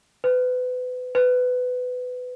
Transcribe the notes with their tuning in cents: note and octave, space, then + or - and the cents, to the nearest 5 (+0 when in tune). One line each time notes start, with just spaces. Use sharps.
B4 +30
B4 +20